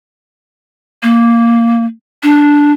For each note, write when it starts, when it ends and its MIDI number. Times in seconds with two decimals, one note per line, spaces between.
1.03 1.85 58
2.23 2.72 62